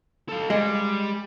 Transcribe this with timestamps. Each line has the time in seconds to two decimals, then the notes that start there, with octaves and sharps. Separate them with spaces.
0.29 A4 F5
0.50 G3 G#3